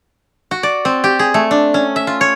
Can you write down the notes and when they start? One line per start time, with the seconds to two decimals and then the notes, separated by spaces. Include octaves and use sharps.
0.51 F#4
0.63 D5
0.85 C4
1.04 G4
1.19 G#4
1.34 A3
1.51 D4
1.74 C#4
1.96 E5
2.07 F4
2.21 C#5